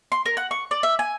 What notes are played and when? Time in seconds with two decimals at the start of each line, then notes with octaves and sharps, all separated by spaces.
0.12 C6
0.26 A#4
0.37 F#5
0.51 C#6
0.71 D5
0.83 E5
0.99 G#5